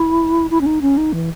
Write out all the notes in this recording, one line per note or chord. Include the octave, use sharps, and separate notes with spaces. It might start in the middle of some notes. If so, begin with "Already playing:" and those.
Already playing: E4
E4
C#4
D#4
C#4
D#4
E3